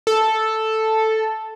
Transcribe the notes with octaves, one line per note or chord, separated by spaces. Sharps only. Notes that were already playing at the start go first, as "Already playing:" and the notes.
A4